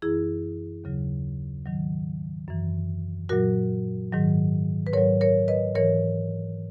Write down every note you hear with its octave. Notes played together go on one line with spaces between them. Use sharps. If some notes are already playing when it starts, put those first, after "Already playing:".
F#2 E3 E4 G#4
D#2 C#3 F#3
G#2 D#3 F#3
F#2 E3
A#2 F#3 F#4 A#4
G#2 D#3 F#3
B4
G#2 F#3 A#4 C#5
A#4 C#5
B4 D#5
G#2 E3 A#4 C#5